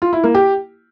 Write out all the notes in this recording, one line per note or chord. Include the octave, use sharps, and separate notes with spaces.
F4
E4
A#3
G4